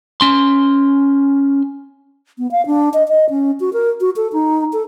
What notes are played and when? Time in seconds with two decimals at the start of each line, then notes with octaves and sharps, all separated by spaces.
0.21 C#4 C6
2.38 B3
2.51 F5
2.66 D4
2.94 D#5
3.08 D#5
3.30 C#4
3.60 F#4
3.73 A#4
4.01 F#4
4.16 A4
4.33 D#4
4.73 A4